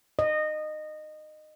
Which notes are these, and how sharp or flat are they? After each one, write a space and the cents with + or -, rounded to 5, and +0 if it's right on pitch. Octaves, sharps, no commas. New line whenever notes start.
D#5 -20